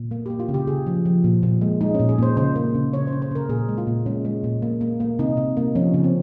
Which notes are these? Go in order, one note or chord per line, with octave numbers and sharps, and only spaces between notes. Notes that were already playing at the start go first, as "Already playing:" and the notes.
Already playing: A#2
A#3
A#3 G4
F4
C#3
G4
C#3 G#4
F3
F3
A#2
A#2
G#3
G#3 D#4
A#2 C#4
G#4
A#2 C5
C#3 C5
A#3
C#3
C#3 C#5
C5
C#3
C5
C#3 A#4
A#2 G#4
G#3
F4
A#2
G#3 C#4
G#3
A#2
A#3
A#3
A#3
C3 D#4
C3
A#3
F3 C#4
C#3
C4